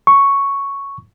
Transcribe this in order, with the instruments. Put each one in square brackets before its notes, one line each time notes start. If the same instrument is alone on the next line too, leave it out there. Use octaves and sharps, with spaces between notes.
[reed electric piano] C#6